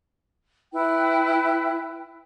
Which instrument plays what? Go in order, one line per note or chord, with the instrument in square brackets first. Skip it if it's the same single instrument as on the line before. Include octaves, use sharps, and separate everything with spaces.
[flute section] E4 B4 G5